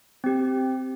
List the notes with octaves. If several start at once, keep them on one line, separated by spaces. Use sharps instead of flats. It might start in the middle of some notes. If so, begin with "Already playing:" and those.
C4 G4